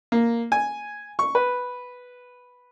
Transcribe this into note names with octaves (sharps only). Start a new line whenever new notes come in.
A#3
G#5
C#6
B4